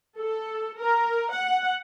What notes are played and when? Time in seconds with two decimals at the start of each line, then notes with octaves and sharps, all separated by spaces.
0.19 A4
0.78 A#4
1.32 F#5